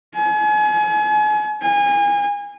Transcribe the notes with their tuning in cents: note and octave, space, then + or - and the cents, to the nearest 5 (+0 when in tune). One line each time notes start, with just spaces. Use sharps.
G#5 +35
G#5 -30